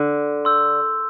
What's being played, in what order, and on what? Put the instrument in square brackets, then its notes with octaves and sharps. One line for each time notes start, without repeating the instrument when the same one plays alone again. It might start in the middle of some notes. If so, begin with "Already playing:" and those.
Already playing: [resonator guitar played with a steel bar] D3
[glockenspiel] C6 E6 G6